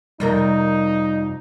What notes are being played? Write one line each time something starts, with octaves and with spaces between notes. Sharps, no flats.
F2 C3 G3 D#4 A#4